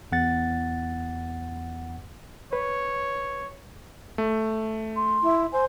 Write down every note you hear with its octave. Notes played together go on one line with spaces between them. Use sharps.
E2 F#5 A6
B4 C#5
A3
C6
E4
C5 G#5